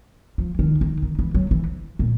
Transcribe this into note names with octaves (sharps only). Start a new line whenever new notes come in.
F3
D#3
D#3
D#3
E3
F#3
E3
A#2